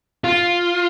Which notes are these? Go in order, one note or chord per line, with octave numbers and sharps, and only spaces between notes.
F4